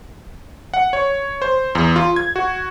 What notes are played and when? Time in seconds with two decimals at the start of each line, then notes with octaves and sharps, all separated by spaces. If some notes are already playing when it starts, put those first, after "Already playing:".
0.74 F#5
0.93 C#5
1.42 C5
1.75 E2
1.96 F4
2.16 G#6
2.36 F#4